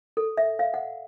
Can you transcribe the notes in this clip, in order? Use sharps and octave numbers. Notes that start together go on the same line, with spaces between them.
A4
E5
F5
F#5